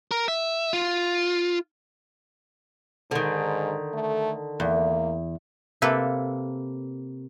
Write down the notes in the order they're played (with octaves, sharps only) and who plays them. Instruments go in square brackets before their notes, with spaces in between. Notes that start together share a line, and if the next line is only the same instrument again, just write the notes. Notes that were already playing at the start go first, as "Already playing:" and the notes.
[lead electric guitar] A#4
E5
F4
[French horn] G#2 [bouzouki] D3 D#3
[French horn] A3
[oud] E2 [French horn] A#3
[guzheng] C3 A#3 A4 B4